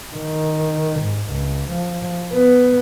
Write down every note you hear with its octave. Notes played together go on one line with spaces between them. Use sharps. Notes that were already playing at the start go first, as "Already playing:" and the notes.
D#3
G#2
C#2
F3
B3